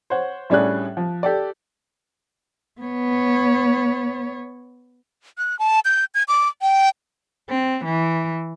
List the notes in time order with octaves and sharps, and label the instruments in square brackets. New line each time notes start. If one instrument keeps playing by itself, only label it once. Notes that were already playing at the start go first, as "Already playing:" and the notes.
[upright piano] C5 C#5 F#5
A2 G3 C#4 D4 G#4 F#6
F3
G4 A4 D5
[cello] B3 C#5
[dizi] F#6
A5
G6
G#6
D6
G5
[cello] C4
E3